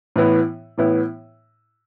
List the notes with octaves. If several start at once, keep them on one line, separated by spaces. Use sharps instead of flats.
A2 E3 B3 E4
A2 E3 B3 E4